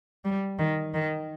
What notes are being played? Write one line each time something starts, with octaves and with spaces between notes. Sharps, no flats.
G3
D#3
D#3